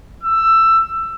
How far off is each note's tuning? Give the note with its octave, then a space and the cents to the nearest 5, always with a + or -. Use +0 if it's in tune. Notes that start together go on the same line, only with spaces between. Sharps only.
E6 +15